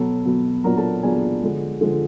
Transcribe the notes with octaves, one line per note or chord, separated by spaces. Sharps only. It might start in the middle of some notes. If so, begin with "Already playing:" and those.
Already playing: B2 F#3 B3 A4 A5
B2 F#3 B3
A#2 F#3 B3 D4 A#4 A#5
A4 A5
A#2 F#3 B3 D4 G#4 G#5
D3 F3 G#3
D3 F3 G#3